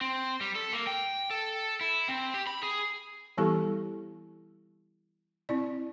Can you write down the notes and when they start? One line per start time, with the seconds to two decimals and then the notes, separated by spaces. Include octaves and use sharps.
0.01 C4
0.41 G3
0.55 A4
0.73 A#3
0.87 G5
1.31 A4
1.81 E4
2.09 C4
2.34 G4
2.47 B5
2.63 G#4
3.38 E3 G3 B3 E4 G4 A4
5.49 C4 E4 D5